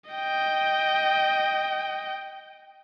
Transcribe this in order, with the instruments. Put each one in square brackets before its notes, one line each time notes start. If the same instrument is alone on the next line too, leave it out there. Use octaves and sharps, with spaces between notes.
[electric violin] D#5 G5